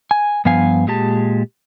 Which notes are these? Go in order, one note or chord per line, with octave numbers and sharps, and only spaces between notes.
G#5
G2 F3 B3 F5 G#5
A#2 G#3 G4 A5